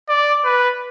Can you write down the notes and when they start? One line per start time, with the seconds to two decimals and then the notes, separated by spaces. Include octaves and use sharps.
0.09 D5
0.45 B4